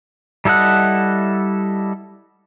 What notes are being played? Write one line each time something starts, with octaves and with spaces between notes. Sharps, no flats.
G3 E4 A4 D#5 F#5